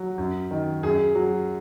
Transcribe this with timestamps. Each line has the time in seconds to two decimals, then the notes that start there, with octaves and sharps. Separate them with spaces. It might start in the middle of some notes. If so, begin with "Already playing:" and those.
Already playing: F#3
0.18 F#2
0.51 D#3
0.83 F#2 G#4
1.15 F#3